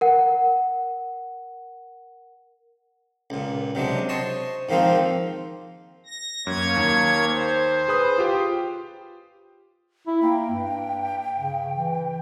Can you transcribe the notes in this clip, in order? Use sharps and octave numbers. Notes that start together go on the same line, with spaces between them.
A#4 F#5
C#2 A#2
C3 F#3 G#3 D4
C5 C#5 D#5 A5
G#2 D#3 F3 A#3 C4 F4
A#6
F#2 A#3 C#5 G#6
D#2
C5
G#4 B4 D#6
F4 G4 G5
E4
A#3 G5
G2
C#3
E3